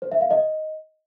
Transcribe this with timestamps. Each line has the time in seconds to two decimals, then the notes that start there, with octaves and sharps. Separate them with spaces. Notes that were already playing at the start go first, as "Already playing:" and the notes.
0.02 C5
0.11 E5
0.21 F5
0.31 D#5